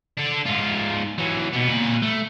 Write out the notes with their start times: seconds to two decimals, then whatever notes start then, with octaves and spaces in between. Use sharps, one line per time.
0.17 D4 A4
0.46 G#2 F4
1.18 E3 F#3
1.53 B2 B3
1.69 A#2 B4
2.02 A3